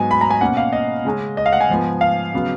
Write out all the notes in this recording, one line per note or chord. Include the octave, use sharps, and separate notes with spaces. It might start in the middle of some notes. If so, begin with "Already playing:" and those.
Already playing: G#2 F#3 B3 G#5
B5
A#5
G#5
B2 A#3 C#4 F#5
F5
D#5
C#3 G#3 C#4
D#5
F5
F#5
G#5
G#2 F3 B3
F5
C#3 F#3 B3